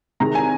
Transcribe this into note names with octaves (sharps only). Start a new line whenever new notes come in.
C3 D#3 G#3 A#5
G#5